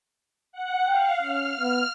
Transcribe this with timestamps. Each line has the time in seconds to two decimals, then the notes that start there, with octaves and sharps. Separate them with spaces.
0.52 F#5
0.88 F5 G5
1.22 C#4 F6
1.60 B3